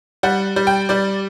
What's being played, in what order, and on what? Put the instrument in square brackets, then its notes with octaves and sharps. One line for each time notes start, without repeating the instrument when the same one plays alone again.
[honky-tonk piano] G3 F#5
G3
G5
G3 D5